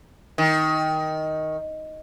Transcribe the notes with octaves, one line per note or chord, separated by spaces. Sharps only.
D#3